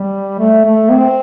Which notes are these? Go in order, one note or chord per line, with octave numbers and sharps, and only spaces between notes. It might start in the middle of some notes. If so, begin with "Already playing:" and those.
Already playing: G3
A3
A3
C4